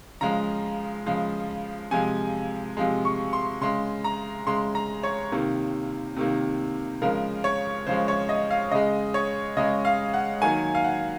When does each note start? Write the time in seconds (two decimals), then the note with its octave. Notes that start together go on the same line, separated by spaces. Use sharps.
0.21 C#3 F3 G#3 A#5
1.06 C#3 F3 G#3
1.91 C3 F3 G#3 G#5
2.77 C3 F3 G#3
3.05 C#6
3.33 C6
3.61 C#3 G#3 C6
4.04 A#5
4.47 C#3 G#3 C6
4.75 A#5
5.03 C#5
5.32 C3 D#3 A#3
6.17 C3 D#3 A#3
7.02 C#3 F3 G#3 A#4
7.44 C#5
7.87 C#3 F3 G#3 C5
8.08 C#5
8.29 D#5
8.50 F5
8.71 C#3 G#3 D#5
9.14 C#5
9.57 C#3 G#3 D#5
9.85 F5
10.14 F#5
10.42 D#3 F#3 A#3 G#5
10.75 F5
10.84 F#5